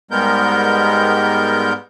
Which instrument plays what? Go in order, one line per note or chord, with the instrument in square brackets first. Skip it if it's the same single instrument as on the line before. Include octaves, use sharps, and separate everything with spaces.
[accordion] G#2 G3 G#3 B3 A#4 G6